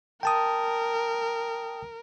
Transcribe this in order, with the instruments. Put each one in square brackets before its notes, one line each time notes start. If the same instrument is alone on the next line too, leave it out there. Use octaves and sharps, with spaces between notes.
[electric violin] A#4 [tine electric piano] G5 A5 D#6